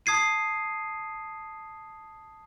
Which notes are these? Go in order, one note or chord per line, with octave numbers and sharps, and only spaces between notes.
A5 D#6 G#6 C7 D#7